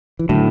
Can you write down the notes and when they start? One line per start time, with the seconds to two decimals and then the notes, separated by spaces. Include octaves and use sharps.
0.19 E3
0.29 A2 D3 F#3